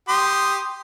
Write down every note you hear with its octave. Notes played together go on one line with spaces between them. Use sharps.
G4 C6 D#6